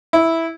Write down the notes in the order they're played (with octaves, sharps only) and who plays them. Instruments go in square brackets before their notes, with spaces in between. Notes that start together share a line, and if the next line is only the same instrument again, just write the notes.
[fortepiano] E4